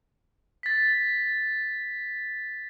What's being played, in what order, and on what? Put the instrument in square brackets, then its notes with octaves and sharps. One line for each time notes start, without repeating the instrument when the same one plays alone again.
[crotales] A6 B6